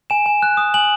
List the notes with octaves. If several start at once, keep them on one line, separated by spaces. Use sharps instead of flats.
G#5 E7
G#5
F#6
D#6
G#5 F#7